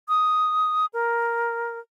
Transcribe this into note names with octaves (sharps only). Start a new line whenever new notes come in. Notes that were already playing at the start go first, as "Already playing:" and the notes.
D#6
A#4